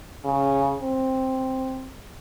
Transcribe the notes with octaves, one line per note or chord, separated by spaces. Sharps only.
C#3
C4